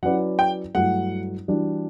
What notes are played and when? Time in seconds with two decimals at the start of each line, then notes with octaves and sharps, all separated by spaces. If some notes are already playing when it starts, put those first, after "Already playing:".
0.03 F#3 C#4 E4 B4 D5 F#5
0.39 G5
0.75 G2 F#3 A3 E4 F#5
1.48 E3 G3 D4 F#4